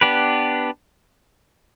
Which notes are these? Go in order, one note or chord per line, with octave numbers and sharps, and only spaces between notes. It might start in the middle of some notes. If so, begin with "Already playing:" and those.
B3 D4 G4 B4